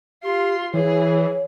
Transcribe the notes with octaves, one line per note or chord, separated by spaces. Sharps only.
F4 G4 C6
E3 G#4 C#5